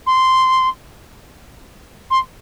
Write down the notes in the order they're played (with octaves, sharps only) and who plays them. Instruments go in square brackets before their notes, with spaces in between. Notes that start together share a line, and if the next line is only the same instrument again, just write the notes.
[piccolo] C6
C6